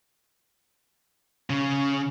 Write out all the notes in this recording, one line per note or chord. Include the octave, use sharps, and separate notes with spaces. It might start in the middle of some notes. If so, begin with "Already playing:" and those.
C#3